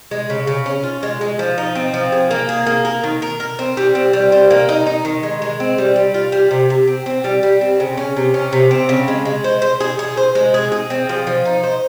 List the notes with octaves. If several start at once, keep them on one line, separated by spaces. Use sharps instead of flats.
G#3
C#3
C#3
C#4
F4
G#3
G#3
F3
D#4
C4
F3
G#4
A#3
G#4
A#3
A#4
D#3
A#4
A#4
C4
G3
C4
G3
C5
A#3
D#4
D#4
D#3
G#3
G#3
C4
G3
G3
F4
G3
C3
C3
C4
C4
G3
G3
C4
C#3
C#4
C3
C#4
C3
C4
C#3
G#3
G#3
C5
C5
G#4
G#4
C5
G#3
G#4
G#4
C4
F3
F3
D#4
C5